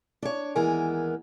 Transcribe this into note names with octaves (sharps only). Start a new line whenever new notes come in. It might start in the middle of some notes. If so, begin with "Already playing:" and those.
D4 C#5
D#2 E3 G#3 B3 A#4 G#5